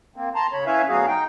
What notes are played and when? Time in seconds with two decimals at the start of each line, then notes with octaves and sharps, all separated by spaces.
0.16 A#3 C4
0.35 A5 A#5 C6
0.53 C#3 C#5 B5
0.66 C#4 E4 B4 C#5 E5 F5
0.89 D2 F#3 B3 F#4 G#4 F5
1.08 D#4 G5